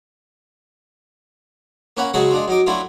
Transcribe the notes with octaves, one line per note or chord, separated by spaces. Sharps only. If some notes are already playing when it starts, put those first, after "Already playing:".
A#3 C#4 F#5 B5
C#3 F#3 G#3 F#4 G#4 A4
G#3 D4 F4
F#2 D#4 D6
F#3 A3 D4 E4 F4